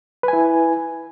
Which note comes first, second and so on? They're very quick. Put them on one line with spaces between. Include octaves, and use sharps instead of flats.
B4 G#5 E4